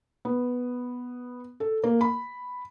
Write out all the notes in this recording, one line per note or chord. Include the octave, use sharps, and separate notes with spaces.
B3
A4
A#3
B5